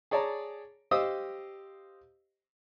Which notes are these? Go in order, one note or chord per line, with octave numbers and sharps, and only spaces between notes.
G#4 C#5 D5 A5 A#5
G4 C5 D#5 F5 D#6 E6